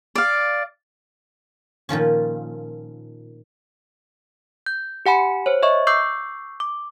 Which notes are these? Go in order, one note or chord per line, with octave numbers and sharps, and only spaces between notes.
D5 F5
A#2 D#3 F3 C#4
G6
G4 F#5 G#5 B5 C#7
C5 C#5
D#5 E5 C#6
C#6 D6 E6 G6 C7
D6